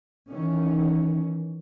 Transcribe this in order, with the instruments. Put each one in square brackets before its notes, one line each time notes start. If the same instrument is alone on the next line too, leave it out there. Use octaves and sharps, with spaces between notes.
[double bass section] D#3 E3 C#4